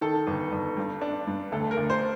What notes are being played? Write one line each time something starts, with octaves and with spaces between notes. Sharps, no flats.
D#3 A4
G1
G1
G2
D4
G2
D2 A4
A#4
D2
C5